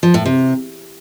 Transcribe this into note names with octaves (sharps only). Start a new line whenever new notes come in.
F3
A2
C3